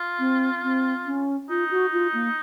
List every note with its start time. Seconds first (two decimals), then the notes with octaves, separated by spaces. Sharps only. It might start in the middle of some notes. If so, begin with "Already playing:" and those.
Already playing: F4
0.19 C4
0.63 C4
1.06 C#4
1.49 D#4 F4
1.71 F#4
1.92 F4
2.14 A#3